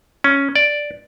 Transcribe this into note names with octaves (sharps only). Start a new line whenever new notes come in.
C#4
D5